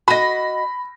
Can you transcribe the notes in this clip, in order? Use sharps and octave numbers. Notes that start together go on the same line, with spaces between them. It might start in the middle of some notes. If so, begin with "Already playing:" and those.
F#4 D#5 B5 A#6